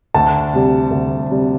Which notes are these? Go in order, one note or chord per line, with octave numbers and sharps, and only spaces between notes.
D2 A5
C3 G3
D2
C3 G3